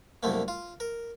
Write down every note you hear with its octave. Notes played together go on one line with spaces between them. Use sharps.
C2 F#2 A3 A#3
F4
A#4